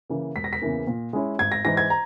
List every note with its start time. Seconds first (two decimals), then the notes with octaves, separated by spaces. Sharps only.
0.09 C#3 E3 A#3
0.36 E1 B6
0.44 A#6
0.53 B6
0.62 E2 C#3 E3 A#3
0.87 A#2
1.13 G#3 C#4 E4
1.39 G#1 G#6
1.52 A#6
1.65 G#2 E3 A#6
1.77 G#6
1.90 A#5